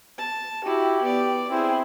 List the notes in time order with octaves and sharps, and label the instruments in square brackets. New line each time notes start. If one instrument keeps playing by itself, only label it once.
[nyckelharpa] A5
[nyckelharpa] E4 F#4 [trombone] G4
[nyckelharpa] B3 D5
[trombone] C4 [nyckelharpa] E4 G#4